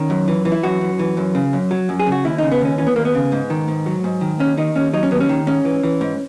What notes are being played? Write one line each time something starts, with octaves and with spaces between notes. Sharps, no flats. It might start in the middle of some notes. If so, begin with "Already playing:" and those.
Already playing: D#3 C#4
F#2
E3
E3
E4
F#2 F#4
F#2
E3
F#2
C#3
F#2
F#3
F#2
G#4
C#3
F#4
D#2 E4
C#3 D#4
B3
D#2 C#4
E3 C#4
B3
D#2 A#3
B3
C#3
G#2
D#3
G#2
F#3
G#2
D#3
D#2 C#4
D#3 D#4
D#2 C#4
F#3 D#4
C#4
D#2 B3
C#4
D#3
G#2 C#4
E3
E3
G#2